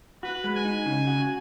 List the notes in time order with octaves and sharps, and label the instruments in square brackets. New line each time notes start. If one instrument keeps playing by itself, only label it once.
[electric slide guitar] F#4 [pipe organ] B4
[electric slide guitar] G#3
[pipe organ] G#5
[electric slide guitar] D#4
C#3
F#4